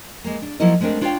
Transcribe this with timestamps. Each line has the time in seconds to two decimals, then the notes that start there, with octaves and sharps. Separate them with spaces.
0.24 G#3 A#3
0.42 D4
0.60 F3 F#3 A#3 E4 A#4 D#5
0.81 G#3 A3 C4 D4 A#4
1.01 D4 F4 C#5 D5 F5 G5